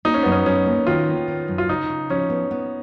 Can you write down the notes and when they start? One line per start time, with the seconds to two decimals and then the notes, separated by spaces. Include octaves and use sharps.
0.05 A#3 D#4
0.14 C#4
0.23 F#2 B3
0.32 C#4
0.46 F#2 C#4
0.66 A#3
0.87 D#3 F4
1.08 A#3
1.28 D#3
1.48 F#2
1.58 F4
1.69 C#3 D#4
1.89 C#3
2.10 F3 C#4
2.30 B3
2.51 B3